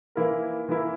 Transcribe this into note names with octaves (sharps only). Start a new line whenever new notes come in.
E3 A#3 E4 A#4
E3 A#3 E4 A#4